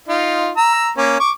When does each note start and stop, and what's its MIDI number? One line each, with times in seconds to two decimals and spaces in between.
0.08 0.50 63
0.08 0.50 65
0.57 0.90 82
0.57 0.90 88
0.97 1.15 58
0.97 1.15 61
1.20 1.31 85
1.20 1.31 86